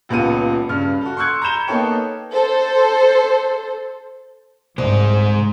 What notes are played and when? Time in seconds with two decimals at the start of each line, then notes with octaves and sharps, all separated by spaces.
0.09 D#1 C#2 B3 F4 D#7
0.69 G2 C#3 F6
1.01 F#4 A4
1.17 C6 C#6 E6 F#6 G#6 C#7
1.42 A#5 B5 G6 E7 G7
1.68 A#3 B3 D#4 A4 C#5 G5
2.32 A4 C5
4.78 C2 G#2 G#3 C5